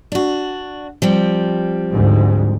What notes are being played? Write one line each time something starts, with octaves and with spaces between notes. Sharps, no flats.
D4 F#4
F3 G3 C4
D2 G#2